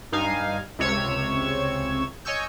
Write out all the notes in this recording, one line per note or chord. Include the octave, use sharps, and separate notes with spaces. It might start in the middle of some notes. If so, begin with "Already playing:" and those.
G2 D#4 F5 G#5
C#2 C3 C#5 E6 G#6
C#5 D#5 G#5 C#6 E6 G6